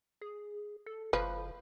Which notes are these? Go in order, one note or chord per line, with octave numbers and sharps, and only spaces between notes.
G#4
A4
F#1 F3 B4